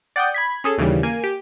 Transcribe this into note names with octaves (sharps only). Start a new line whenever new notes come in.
D5 F#5 G5 D#6 G6
B5 G#6 B6
C#4 G#4 A4
D#2 C#3 E3 G3
A#3 G#5
G4